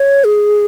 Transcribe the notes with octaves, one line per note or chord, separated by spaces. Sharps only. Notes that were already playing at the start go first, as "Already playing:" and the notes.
Already playing: C#5
G#4